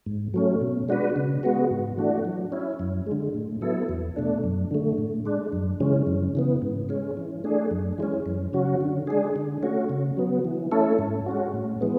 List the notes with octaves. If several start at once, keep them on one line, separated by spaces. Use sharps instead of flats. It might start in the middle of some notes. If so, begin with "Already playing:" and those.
G#2
F#3 A3 C#4
B2
G#3 D4 F#4 B4
C#3
G#3 B3 F#4
G#2
E3 A3 D4 F#4
F#3
C#4 E4
F#2
D3 G#3
A2
F#3 B3 E4 A4
E2
B2 A3 D4
F#2
D3 A3
A2
G#3 D4
F#2
C#3 E3 G#3 C#4
F#2
C#3 E3 B3
G#2
G#3 C#4
E3
A3 D4 G#4
F#2
E3 G#3 C#4
F#2
C#3 F#3 C#4 F#4
D3
G#3 D4 G#4
D3
A3 C#4 F#4
C#3
F#3 B3
E3
A3 C#4 E4 A4
G#2
G#3 C#4 F#4
A2
E3 G#3 B3